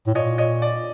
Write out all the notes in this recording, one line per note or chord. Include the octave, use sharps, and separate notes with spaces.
A2
A#2 C#5 D#5
C#5 D#5
D5